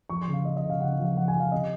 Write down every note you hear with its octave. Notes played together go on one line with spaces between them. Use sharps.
F3 C#6
C6
C#3
F5
F3 D#5
D#5
C#3
F5
C#3 F#5
F5
F3
F5
F3 F#5
G#5
F3
F5
C3 D#5